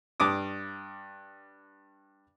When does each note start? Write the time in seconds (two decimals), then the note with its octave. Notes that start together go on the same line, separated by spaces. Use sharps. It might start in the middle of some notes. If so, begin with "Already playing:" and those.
0.20 G2 D6 D#6